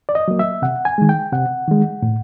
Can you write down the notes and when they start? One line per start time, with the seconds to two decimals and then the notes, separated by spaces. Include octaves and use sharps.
0.09 D5
0.15 D#5
0.28 F#3 A#3
0.39 E5
0.62 C3 F#5
0.85 G#5
0.98 D#3 G#3
1.09 G5
1.32 C3 F#5
1.68 D#3 G#3
2.03 A2